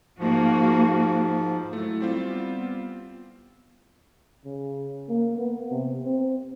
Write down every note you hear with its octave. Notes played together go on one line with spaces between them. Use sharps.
G#2 F3 A#3 F#4
F#3 A3 E4
G3 C4 F4
B3
C#3
A#3
B3
C3
C4